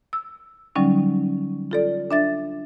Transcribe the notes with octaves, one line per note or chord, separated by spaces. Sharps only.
E6
D3 F#3 G3 C#4 D#4
F4 A4 D5
D4 E5 A6